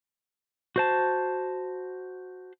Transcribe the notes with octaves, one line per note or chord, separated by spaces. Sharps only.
F#4 C5 A5